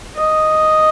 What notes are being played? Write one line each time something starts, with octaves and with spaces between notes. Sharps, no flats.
D#5